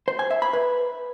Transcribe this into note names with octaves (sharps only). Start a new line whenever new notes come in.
C5
G#5
E5
B5
B4